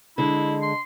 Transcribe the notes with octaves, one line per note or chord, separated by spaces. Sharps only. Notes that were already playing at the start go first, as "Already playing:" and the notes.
D3 G#3 E4
C6